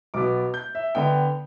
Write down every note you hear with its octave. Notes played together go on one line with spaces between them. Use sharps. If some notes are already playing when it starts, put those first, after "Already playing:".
B1 B2 B3 D6
G6
E5
D3 B3 G5